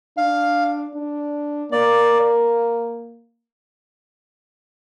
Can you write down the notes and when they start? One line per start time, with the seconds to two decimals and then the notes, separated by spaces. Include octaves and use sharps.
0.17 D4 F5
0.95 D4
1.72 A#3 D5